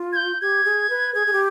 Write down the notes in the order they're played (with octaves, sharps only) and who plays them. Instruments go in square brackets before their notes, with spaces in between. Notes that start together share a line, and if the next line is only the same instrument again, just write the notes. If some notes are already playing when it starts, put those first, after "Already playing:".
Already playing: [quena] F4
[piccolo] G#6
G6
[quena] G4 [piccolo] G#6
[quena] G#4
B4
[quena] G#4 [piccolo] G#6
[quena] G#4
G4